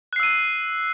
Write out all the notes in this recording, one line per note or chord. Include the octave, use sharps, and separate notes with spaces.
E6 F#6 C7 D#7